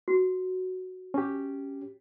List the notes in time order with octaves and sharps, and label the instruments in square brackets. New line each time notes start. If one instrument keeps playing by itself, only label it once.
[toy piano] F#4
[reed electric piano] C#4 G4